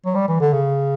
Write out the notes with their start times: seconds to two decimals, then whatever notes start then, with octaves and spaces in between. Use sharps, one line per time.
0.06 F#3
0.15 G3
0.28 E3
0.41 D3
0.53 C#3